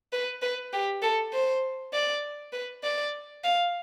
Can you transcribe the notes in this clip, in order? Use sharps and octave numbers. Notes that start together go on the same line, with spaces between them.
B4
B4
G4
A4
C5
D5
B4
D5
F5